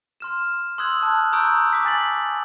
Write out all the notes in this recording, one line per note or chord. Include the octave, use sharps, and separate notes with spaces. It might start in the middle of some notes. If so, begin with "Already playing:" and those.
C6 F6 E7
C6 D#6 E6 F#6 G#6 F#7
A5 F6 F#6
A#5 C#6 D#6 E6 G6 D7
D6 B6
G#5 A6 B6 F#7